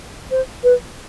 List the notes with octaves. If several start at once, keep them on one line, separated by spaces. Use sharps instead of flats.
C5
B4